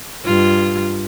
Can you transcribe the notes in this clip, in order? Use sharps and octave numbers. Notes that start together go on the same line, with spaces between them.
G2 F4